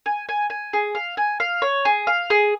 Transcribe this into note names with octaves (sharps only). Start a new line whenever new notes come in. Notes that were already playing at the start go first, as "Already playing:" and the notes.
G#5
G#5
G#5
G#4
F5
G#5
F5
C#5
G#4
F5
G#4